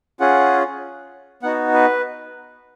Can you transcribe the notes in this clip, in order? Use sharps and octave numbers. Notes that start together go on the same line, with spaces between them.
C#4 F4 G#4 F#5
B3 D#4 F#4 F#5
B4